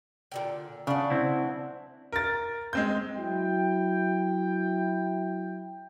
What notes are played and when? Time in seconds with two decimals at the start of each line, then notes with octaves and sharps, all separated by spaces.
0.32 A#2 D3 G5
0.87 C#3 D4 F#5
1.10 C4 E4
2.12 A#4 A6
2.73 G#3 C4 G6
3.17 F#3 E4 G5